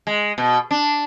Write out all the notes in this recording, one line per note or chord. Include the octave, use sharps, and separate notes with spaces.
G#3
B2
D4